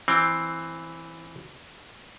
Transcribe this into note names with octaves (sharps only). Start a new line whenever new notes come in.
E3 C4